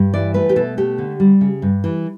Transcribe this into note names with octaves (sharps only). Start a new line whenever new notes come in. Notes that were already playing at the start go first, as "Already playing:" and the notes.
Already playing: G2
E3 D5
A3 B4
G4
B2 A4
A3 G4
D3
G3
C#3
G2
E3